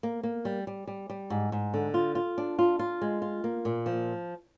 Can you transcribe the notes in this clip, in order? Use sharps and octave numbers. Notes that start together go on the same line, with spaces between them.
A#3
A#3
G3
G3
G3
G3
G#2
G#2
D3
F4
F4
D4
F4
F4
G#3
F4
A#3
A#2
F3